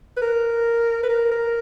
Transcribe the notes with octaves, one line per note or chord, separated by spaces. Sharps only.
B4
A#4
B4
A#4
A#4